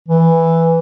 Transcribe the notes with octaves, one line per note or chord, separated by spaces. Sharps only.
E3